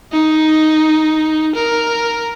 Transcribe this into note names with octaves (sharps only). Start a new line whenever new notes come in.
D#4
A#4